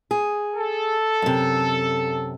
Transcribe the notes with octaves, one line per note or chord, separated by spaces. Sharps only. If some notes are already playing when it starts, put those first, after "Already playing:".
G#4
A4
F#2 C3